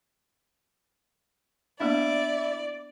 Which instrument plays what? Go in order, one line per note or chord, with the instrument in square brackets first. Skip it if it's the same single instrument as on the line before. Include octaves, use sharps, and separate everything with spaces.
[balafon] A#3 B3 D4 [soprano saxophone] E4 [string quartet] D5